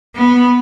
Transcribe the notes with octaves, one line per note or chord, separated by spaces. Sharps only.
B3